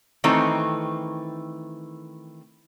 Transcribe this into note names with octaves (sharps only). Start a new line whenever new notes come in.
D#3 E3 A3 C4 A#5